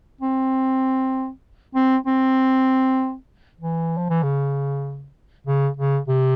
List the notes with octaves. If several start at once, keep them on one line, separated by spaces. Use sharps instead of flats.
C4
C4
C4
E3
F3
E3
C#3
C#3
C#3
C3